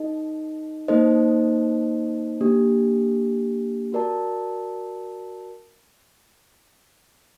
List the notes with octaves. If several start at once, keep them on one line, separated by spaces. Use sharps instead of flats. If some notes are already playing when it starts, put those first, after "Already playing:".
Already playing: D#4 A4 D#5
A#3 D#4 A4 C5 D#5
A#3 D4 G4
F#4 A#4 D5 A5